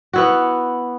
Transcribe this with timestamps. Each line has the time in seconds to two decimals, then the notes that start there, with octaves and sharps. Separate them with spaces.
0.13 B3 E4 F#4